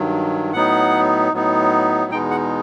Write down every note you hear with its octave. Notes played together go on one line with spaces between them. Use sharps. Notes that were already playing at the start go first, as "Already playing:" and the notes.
Already playing: G2 D#3 F#3
A2 F#3 B3 D#4 F#5
A2 F#3 B3 D#4
E2 B2 G#3 B3 D#4 G5
F#5